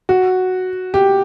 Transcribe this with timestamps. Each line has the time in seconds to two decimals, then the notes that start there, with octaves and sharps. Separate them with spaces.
0.09 F#4
0.94 G4